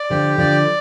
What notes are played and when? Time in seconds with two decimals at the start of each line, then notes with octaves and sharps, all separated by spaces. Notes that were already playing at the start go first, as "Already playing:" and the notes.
Already playing: D5
0.10 D3 F3 G4
0.38 D3 F3 D5